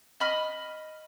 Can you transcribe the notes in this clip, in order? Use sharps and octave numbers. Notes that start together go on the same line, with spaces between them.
D#5 B5 F6